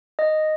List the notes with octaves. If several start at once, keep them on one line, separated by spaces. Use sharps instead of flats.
D#5